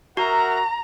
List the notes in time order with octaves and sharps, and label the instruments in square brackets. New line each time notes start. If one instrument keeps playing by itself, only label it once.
[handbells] F#4 [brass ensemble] A#4 E5 F#5 [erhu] A#5